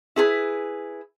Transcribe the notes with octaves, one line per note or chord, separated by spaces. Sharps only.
E4 G#4 A4 B4